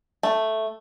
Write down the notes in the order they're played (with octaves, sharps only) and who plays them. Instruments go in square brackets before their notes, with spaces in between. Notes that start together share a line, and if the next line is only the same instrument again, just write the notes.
[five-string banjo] A3